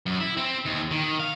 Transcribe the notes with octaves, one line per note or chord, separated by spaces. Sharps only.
F#2
E4
C4
D#2
D#3
F5